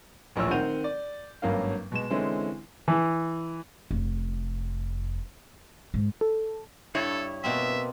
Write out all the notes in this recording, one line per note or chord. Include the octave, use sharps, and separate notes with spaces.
D1 A#1 F3 C#5 E6
D#3 C4 F#5 G6 D#7 F7
D5
G#1 G2 F#3 A#3 C#4 F5
B2 G#3 E7
D3 E3 G#3 C4 C#4 E4
E3
F1
G#2
A4
G2 E4 A4 C#5
B2 A#3 C4 E5